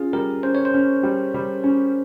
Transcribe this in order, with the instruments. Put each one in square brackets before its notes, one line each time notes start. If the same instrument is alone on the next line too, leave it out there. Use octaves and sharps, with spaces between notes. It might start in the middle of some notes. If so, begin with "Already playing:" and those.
Already playing: [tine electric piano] C#4 G#4 [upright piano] F4
[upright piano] G3 [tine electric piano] A#4
[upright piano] C#4 [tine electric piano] C5
[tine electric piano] C#5
C5
[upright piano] C#4
G3
G3
C#4